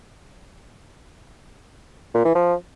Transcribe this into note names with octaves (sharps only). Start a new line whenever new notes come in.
A#2
E3
F3